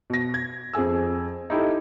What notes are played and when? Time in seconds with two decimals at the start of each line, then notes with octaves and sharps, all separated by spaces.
0.10 B2 A#6
0.34 G#6
0.73 F2 G#4 G#5 E6
1.50 D#4 E4 G4 A4